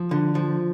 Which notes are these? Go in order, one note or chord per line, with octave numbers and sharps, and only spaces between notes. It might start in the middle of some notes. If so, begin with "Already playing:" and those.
Already playing: F3
D3
F3